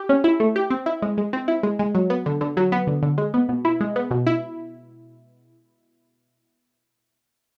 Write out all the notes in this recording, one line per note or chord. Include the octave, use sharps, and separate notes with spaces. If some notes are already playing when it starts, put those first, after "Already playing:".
Already playing: G4
C#4
E4
A3
G4
C4
E4
G#3
G#3
C4
E4
G#3
G#3
F#3
B3
D3
D3
F#3
B3
D3
D3
G#3
B3
B2
E4
G#3
B3
B2
E4